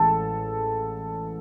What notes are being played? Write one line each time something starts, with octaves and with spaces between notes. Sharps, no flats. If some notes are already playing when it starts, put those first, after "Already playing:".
Already playing: A1 A2 G#3 A4 A5